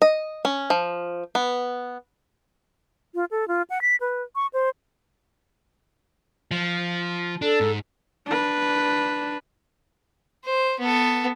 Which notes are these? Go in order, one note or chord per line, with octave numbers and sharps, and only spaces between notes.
D#5
C#4
F3
B3
F4
A4
F4
F#5
B6
B4
C#6
C5
F3
D4 A4
G#2
D4 B4
C5
B3 A4